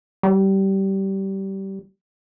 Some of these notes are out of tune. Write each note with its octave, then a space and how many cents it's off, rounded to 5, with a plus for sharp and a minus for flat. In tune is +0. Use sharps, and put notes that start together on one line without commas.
G3 -20